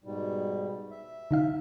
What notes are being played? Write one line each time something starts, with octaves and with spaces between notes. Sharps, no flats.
G#2 B2 G3
E5
D3 D#4 F5